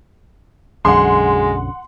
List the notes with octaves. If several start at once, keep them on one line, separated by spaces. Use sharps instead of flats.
B1 F#2 D3 G#3 F#5 C6